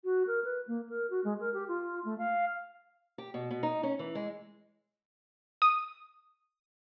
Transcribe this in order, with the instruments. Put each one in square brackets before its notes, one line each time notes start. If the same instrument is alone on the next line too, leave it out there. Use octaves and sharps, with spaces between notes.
[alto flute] F#4
A#4
B4
A#3
A#4
F#4
G#3
A#4
G4
F4
A3
F5
[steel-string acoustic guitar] G4
B2
B2
D#4
C#4
E3
G#3
[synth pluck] D#6